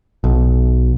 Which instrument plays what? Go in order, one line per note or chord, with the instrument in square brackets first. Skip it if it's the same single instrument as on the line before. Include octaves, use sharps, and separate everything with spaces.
[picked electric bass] B1